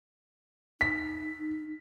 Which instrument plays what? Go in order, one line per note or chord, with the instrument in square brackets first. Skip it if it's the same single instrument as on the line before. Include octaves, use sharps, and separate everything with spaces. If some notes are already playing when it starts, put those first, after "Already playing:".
[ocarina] D#4 [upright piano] B6